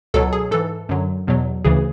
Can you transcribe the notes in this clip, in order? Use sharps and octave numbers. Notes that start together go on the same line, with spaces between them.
C#2 B2 F#3 A4
G#4
G#2 E3 A4
F#2 D3 F#3
E2 B2 F#3
D2 C#3 E3 G#4